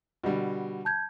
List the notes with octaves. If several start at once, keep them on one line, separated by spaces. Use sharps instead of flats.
B2 D3 G3
A5 G6 G#6